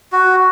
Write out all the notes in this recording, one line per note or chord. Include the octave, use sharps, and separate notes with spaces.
F#4